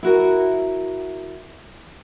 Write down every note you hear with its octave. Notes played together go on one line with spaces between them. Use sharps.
E4 F#4 A#4